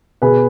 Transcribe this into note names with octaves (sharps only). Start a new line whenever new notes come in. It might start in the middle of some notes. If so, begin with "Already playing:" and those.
B2 G#4 B4